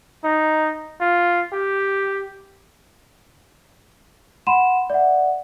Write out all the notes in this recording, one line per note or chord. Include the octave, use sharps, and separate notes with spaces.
D#4
F4
G4
F#5 B5 C6 D#7 E7
D5 E5 F#5